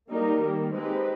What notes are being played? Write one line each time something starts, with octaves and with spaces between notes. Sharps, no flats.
G3 A#3 D#4 G4 A#4
D#3 G3 A#3
G#3 C4 D#4 G4 B4